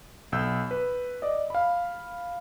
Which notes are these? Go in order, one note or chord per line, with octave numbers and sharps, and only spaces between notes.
B1 E6 G6
B4
D5 D#5
F5 B5